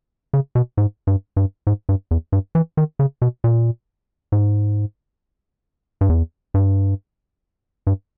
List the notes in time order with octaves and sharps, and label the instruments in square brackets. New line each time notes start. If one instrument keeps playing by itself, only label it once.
[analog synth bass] C#3
B2
G#2
G2
G2
G#2
G2
E2
G2
E3
D#3
C#3
B2
A#2
G#2
G2
E2
G2
G2